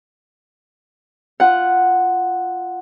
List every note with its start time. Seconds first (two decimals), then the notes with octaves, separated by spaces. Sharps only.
1.40 F4 F#5